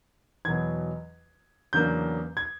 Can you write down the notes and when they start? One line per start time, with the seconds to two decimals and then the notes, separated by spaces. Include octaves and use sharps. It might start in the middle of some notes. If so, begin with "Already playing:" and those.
0.45 E2 B2 F#3 G#6
1.73 E2 C#3 F#3 A#3 D4 G6
2.37 G#6